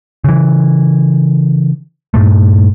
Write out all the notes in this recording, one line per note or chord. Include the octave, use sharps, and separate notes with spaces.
C#3 E3
G2 A#2 A3